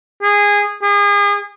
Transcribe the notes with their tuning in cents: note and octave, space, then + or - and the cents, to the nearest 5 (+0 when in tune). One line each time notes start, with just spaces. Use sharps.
G#4 -20
G#4 -35